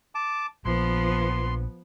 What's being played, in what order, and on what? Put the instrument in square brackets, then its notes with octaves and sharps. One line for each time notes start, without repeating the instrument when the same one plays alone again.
[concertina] A5 D6
[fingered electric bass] A#1 [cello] F3 B3 [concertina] C6